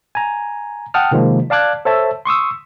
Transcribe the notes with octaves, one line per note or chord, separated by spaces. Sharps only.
G#5 A#5
F#5 G5 A5 D#6 F6
C3 D#3 F3 G#3 A#3
D5 F5 A5 D6 F#6 G#6
A4 C5 C#5 E5 A5
C6 C#6 D#6 E6